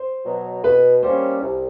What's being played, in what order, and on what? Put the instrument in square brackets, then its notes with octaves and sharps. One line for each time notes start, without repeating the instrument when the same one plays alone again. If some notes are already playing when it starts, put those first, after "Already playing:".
Already playing: [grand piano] C5
[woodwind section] B2 F#3
[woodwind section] B2 [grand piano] B4
[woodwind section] G3 A#3 C#4 [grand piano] C5
[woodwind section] C2